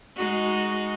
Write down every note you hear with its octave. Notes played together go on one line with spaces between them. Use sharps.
G#3 D#4 F#4